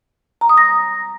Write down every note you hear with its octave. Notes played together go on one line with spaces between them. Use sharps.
A#5
D#6
A#6